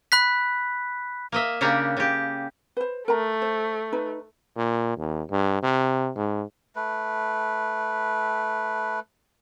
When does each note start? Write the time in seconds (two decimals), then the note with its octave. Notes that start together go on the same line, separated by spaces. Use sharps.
0.12 B5 F#6 B6
1.32 A#3 D#5 E5
1.61 C#3 A#3 D4 G4 A#5
1.97 C#3 G4
2.77 B4 C5
3.08 A3 A#4 A#5
3.42 C5
3.93 D#4 B4
4.57 A#2
4.98 D#2
5.31 G2
5.63 C3
6.16 G#2
6.76 A3 B4